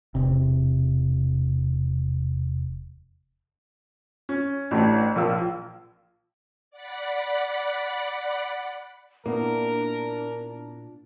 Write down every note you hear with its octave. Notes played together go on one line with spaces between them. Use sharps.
E1 C3
C#4
A1 A3 D4
A#1 F3 A#4 F5 E6
D5 F#5 B5
A#2 A#3 B3 D4 E4 A#4